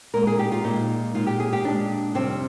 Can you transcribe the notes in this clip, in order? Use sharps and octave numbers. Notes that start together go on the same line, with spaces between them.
A#2 G#3 A#4
G#4
G4
F4
A#2 G#3 D#4
A#2 G#3 F4
G4
G#4
G4
A#2 G#3 D4
F2 C3 G3 C4